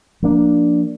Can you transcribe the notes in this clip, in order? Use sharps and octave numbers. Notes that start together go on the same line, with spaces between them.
F3 A#3 D4